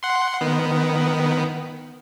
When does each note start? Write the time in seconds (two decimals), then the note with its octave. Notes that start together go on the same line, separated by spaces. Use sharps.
0.03 F#5 C6
0.41 D#3 B3